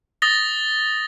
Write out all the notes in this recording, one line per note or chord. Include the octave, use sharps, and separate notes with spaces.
D#6 A6 A#6 G7